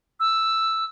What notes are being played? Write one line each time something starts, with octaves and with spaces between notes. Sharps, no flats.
E6